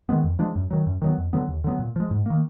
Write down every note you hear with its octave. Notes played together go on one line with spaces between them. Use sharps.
D#3 G#3 B3
F2
F3 G#3 D4
F#2
D#3 F#3
F#2
D#3 F#3 B3
F2
D3 F#3 B3
D#2
D3 F#3 B3
A#2
F3 G#3
G#2
D#3 A#3